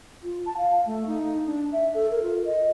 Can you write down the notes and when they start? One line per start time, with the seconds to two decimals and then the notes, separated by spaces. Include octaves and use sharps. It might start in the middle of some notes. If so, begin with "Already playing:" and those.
0.23 F4
0.46 A5
0.57 F5
0.86 A3
1.07 D#4
1.46 D4
1.72 E5
1.95 A4
2.11 A#4
2.23 F4
2.45 D#5